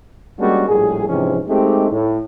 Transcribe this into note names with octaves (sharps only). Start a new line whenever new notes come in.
G3 G#3 A#3 C#4 D4 F#4
A#1 A2 G3 G#4
G#2 C3 E3 F3 G#3 C#4
G#3 A3 C4 D#4 G4
A2